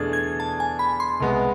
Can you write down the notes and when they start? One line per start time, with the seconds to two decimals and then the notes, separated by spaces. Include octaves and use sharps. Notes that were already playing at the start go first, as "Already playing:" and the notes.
Already playing: E2 B2 A3 D4 G#4 G#6 A6
0.13 G#6
0.40 A5
0.60 G#5
0.79 B5
1.00 C6
1.20 C2 B2 G#3 B3